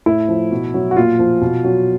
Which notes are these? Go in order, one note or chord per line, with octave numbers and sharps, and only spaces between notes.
A2 E4
F3
B2
F#3
F#4
A#2 F4
F3
B2
F#3